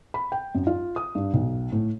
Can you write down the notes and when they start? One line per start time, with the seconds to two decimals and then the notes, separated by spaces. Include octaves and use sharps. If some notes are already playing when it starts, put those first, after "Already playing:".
0.14 B5
0.32 G5
0.55 F#2
0.67 F4
0.96 D#6
1.15 G2
1.33 B1
1.72 A2